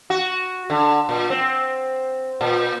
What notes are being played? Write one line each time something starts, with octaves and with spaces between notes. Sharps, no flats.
F#4
D3
A#2
C4
A#2